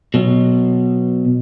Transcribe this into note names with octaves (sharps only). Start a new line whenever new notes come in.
B2 F#3